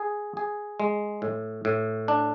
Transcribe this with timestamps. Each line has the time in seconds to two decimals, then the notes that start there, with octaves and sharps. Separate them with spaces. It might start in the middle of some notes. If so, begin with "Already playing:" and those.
Already playing: G#4
0.37 G#4
0.80 G#3
1.22 A2
1.65 A2
2.08 D4